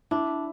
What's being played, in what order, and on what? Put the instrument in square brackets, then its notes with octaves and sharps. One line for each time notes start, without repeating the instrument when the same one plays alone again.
[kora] D4 [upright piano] E4